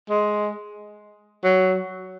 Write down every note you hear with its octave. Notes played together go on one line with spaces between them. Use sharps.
G#3
F#3